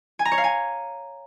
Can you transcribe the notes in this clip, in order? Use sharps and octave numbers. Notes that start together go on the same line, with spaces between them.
G#5
A#5
C#5
F5
G#5